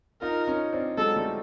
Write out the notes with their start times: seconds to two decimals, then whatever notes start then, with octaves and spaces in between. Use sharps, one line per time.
0.22 D#4 F4 A#4
0.47 C#4 D#4
0.72 C4 D4
0.97 F#3 G#3 A4
1.16 G3 A3